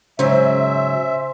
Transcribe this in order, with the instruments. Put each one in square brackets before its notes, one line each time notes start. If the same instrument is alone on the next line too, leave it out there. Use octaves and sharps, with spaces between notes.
[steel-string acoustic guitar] G#2 F#3 [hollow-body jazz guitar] C#3 [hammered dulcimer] C5 G#5 [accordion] E5